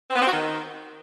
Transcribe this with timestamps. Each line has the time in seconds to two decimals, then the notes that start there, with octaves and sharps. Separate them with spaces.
0.10 C4
0.16 B3
0.21 C4
0.27 F#4
0.32 D#3